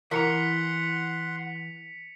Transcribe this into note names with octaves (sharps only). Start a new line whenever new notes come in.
E3 A#4 F#5 C6 B6 C#7 F7